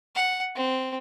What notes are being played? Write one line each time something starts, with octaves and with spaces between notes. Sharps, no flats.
F#5
C4